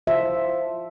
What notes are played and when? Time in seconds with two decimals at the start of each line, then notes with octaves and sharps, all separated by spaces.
0.07 F3 E5